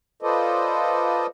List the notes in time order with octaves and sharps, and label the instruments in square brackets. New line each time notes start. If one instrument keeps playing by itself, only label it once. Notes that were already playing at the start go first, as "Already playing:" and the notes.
[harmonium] F4 A4 B4 C5 D5 D#5